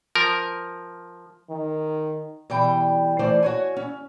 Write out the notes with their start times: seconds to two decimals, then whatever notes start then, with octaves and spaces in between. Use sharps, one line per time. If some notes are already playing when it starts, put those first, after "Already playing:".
0.15 F3 A#4
1.50 D#3
2.50 B2 E3 G3 G5
3.19 E3 A3 C5 D5
3.43 F#4 C#5 G#5
3.76 C#4